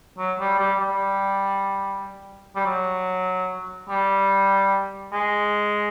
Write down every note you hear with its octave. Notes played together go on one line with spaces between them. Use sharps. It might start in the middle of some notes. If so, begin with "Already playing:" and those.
F#3
G3
G3
G3
G3
F#3
G3
G#3